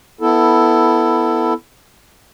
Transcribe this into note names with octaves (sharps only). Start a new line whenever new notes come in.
B3 E4 A4